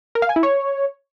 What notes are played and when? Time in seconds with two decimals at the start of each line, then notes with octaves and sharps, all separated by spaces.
0.15 A#4
0.22 F5
0.29 G#5
0.36 E4
0.43 C#5